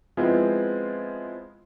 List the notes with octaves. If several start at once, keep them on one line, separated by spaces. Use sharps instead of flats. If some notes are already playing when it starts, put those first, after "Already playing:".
F3 G#3 B3 C4 E4 F4